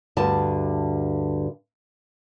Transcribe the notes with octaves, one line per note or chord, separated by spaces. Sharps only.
D2 G2 D3 A5